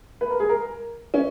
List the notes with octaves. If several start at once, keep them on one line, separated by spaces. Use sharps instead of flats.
B4
A#4
G#4
A#4
C#4